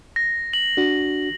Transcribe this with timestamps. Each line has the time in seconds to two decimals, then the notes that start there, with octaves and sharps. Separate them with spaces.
0.16 A#6
0.53 F#7
0.77 D4 F#4